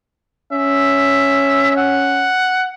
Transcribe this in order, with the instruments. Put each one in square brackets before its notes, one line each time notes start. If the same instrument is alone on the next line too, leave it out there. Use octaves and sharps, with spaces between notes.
[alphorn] C#4 [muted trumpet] E5
[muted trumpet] F#5